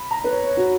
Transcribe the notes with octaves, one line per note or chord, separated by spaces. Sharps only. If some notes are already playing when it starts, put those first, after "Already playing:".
Already playing: B5
A#5
B4
C#5
C#5
F#4